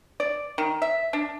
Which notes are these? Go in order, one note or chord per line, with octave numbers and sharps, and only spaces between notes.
D5
D#3
E5
D4